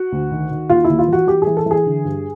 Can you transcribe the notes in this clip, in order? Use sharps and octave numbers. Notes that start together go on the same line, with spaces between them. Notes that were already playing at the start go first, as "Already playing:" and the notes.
Already playing: F#4
D2
D#3
D#3
D#2 F4
E4
D#2
F4
E3 F#4
E3 G4
E3 G#4
A4
E3 G#4
D3
G2